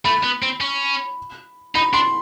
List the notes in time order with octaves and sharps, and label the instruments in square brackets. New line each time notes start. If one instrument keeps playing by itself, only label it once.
[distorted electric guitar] A3 [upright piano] B5
[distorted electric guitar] B3
C4
C#4
[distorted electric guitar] D#4 [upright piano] B5
[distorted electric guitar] D4 [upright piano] C6